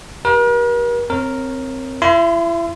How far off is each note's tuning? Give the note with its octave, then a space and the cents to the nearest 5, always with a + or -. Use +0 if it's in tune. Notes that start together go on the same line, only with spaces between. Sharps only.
G4 -5 A#4 +45
C4 +0 A#4 +0 C#5 -25
E4 +35 C6 -25